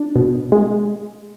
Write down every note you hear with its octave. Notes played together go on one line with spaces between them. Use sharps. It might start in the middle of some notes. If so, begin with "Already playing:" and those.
Already playing: D4
B2
G#3